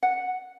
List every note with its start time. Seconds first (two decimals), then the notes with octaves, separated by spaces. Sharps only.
0.03 F#5